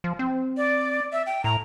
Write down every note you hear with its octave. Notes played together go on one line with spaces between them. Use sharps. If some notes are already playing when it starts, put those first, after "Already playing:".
F3
C4
D5
E5
G5
A2 A#5